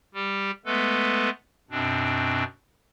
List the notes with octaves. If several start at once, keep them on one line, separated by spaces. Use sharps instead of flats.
G3 G4
G#3 A3 B3 A4 B4
F#2 B2 C4 D4